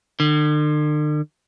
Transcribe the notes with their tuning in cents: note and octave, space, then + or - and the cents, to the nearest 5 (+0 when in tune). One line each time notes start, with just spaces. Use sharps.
D3 +45